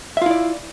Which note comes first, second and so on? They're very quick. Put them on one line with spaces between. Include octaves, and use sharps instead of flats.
E5 F4 E4 D5